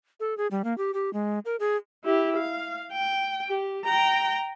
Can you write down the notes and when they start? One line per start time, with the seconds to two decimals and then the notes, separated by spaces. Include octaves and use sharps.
0.20 A4
0.37 G#4
0.51 G3
0.64 A#3
0.78 G4
0.94 G4
1.13 G#3
1.45 A#4
1.60 G#4
2.05 E4 G4
2.37 F5
2.92 G5
3.48 G4
3.85 G5 A#5